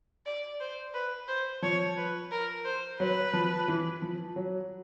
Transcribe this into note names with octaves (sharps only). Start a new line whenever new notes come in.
D5
C5
B4
C5
F3 C#5
B4
A#4
C5
F#3 B4
F3
E3
F3
F#3